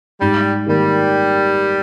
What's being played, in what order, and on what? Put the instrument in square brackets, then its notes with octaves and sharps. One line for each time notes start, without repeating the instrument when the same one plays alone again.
[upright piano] G#2 [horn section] G3
[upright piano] D#3 A#3 [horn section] G3